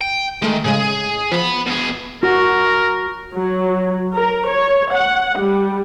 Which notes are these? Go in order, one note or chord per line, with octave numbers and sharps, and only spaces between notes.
G5
D#3 G#3 A3
A2 C#3 G#3 G#4
F3 B3 B5
B2 G#4
F#4 A#4
F#3
A#4
C#5
F#5
G3